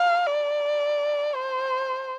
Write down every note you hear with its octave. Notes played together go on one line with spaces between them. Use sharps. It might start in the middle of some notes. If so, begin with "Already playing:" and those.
Already playing: F5
D5
C5